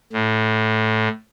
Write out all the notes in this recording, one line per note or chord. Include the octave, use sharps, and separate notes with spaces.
A2